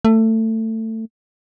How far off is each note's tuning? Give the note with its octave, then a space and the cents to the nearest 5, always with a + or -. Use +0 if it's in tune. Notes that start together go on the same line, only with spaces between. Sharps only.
A3 +20